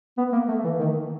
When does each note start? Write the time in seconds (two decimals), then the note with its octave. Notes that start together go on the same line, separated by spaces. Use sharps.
0.17 B3
0.32 A#3
0.48 A3
0.64 E3
0.79 D#3